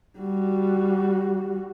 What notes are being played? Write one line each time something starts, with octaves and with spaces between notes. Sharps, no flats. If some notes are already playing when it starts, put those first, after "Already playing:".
G3 F#4